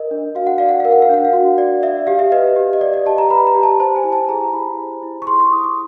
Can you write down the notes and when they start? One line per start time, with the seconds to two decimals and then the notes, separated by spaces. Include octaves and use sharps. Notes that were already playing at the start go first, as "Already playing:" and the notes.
Already playing: A#4 D#5
0.11 D4
0.35 F#4 F5
0.47 F#5
0.58 D5 F5
0.69 F#5
0.80 A#4 F5
0.92 F#5
1.02 F5
1.09 D4 F#5
1.25 F5
1.33 F#4
1.58 D5
1.83 D5 E5
2.07 G4 F5
2.19 E5
2.32 B4 D#5
2.56 G4
2.73 D#5
2.81 D5
2.93 D#5
3.06 G4 A5
3.18 A#5
3.30 B4 B5
3.47 A#5
3.55 G4
3.63 A5
3.80 C5 A5
3.96 G#5
4.04 E4
4.12 A5
4.29 G#4 A#5
4.53 E4 B5
4.78 C5
5.03 E4
5.22 C#6
5.27 G#4 C6
5.40 C#6
5.52 E4 D#6
5.64 D6